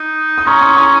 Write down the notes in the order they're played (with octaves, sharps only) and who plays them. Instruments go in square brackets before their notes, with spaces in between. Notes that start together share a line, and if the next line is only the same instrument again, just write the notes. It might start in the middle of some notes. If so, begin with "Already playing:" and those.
Already playing: [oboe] D#4
[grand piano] D#6
[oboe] C#4 [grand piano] A#5 C#6
[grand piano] C6 D#6
A#5 C#6